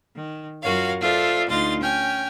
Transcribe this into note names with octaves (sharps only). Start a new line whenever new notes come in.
D#3
F#2 F4 F#4 A#4 C#5 F5
F4 A4 C5 D5 E5 F5
D2 D#4 F4 C6 A6
C#4 G5 G#5 F6